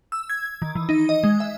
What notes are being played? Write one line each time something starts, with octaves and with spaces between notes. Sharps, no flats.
E6
G#6
D#3
E3
D#4
D#5
G#3
E5